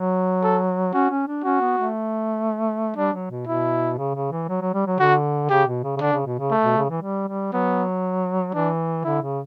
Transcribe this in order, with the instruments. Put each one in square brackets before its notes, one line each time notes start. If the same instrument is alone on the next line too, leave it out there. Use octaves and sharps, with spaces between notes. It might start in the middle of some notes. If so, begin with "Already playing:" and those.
Already playing: [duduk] F#3
[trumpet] A4
[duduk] C#4 [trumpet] F#4
[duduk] C#4
D4
[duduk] C#4 [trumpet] F#4
[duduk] B3
A3
[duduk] G3 [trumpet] D4
[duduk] F#3
B2
[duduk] B2 [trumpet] E4
[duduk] C#3
C#3
E3
F#3
F#3
G3
F#3
[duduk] D3 [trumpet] F#4
[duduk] C#3 [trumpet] G4
[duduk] B2
C#3
C#3
[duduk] D3 [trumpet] D4
[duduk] C#3
B2
C#3
[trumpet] A3
[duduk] B2
C#3
E3
G3
G3
[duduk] F#3 [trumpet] B3
[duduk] E3 [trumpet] D4
[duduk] D3 [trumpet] E4
[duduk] C#3